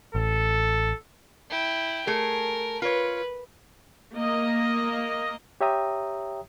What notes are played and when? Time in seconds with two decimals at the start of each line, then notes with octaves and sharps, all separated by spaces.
0.15 A1 A4
1.50 E4 G5
2.07 A3 G#4 A#4
2.82 F4 B4 C#5
4.15 A#3 D#5
5.61 G4 C#5 E5 G5 A#5 D#6